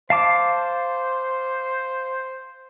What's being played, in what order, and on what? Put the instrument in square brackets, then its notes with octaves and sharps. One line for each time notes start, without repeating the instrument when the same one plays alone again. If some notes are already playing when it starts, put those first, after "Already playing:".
[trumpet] C5 [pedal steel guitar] F5 A5 D6